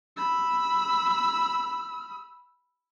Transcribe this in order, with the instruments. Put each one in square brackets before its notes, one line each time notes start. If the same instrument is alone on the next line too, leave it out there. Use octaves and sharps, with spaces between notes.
[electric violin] B5 E6